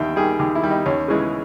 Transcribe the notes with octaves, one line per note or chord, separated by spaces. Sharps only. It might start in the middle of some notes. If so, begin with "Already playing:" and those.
Already playing: D#2 D#3 G3 E5 G5
D#3 G3 G#4
D#2 G4
E4
D#3 G3
D#4
D#2 C#4
C#3 E3 G#3